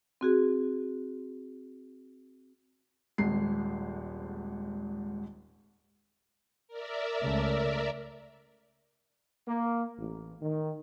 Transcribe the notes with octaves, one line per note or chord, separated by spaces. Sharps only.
C4 F#4 G#4
D#1 G#1 G#2 C7
A#4 D5 E5
C#2 C#3 A3
A#3
A1
D#3